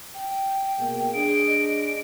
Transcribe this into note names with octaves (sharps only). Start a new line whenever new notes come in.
G5
B2 G#3 A#3
G#3 D4 G#4 D7
D#5